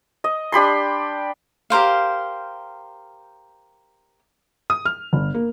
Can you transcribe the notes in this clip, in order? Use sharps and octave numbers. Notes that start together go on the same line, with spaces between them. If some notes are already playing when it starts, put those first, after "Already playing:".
D#5
D4 G4 B5 C6
G4 A#4 C5 F5
D#6
F6
G1
A#3